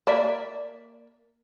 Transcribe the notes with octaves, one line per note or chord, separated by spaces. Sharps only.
A#3 D5 E5